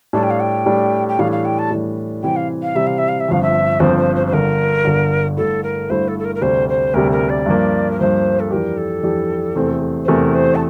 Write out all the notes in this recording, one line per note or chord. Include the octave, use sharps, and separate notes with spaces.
A2 G3 D4 A5
G5
F5
G5
A2 G3 D4
G5
A2 E3 G3 D4 F5
F5
G5
A5
A2 E3 G3 D4
C3 E3 G3 C4 G5
F5
F5
C3 E3 G3 C4 E5
F5
E5
F5
E5
G1 G2 F3 C4 F5
E5
G1 G2 F3 C4 C5
C5
C5
C5
G1 G2 D3 A#4
G1 G2 D3
G2 D3 A3 E4 A4
A#4
G2 D3 A3 E4 C5
A4
A4
A#4
A#4
D2 C3 G3 C5
C5
D2 C3 G3 A#4
A#4
D5
G2 F3 A#3
A#4
G2 F3 A#3 C5
A4
F2 E3 G3 D4 G4 A#4
A4
F2 E3 G3 D4 G4
E2 C3 E3 A3 C4
C5
E2 C3 E3 A3 C4 A#4
C5
A5